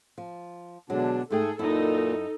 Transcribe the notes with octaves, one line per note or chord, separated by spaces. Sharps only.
F3
B2 D3 F#3 G#3 D4
G#2 A3 G#4 A4 G5
F#2 A#2 D#4 E4 A4